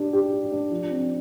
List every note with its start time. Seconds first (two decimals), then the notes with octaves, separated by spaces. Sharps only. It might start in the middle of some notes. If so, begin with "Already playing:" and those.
Already playing: D4 G4
0.13 G4
0.33 G4
0.52 D4
0.71 F3
0.91 C4